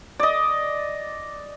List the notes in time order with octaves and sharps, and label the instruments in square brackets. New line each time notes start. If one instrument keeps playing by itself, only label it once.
[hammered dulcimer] D5 D#5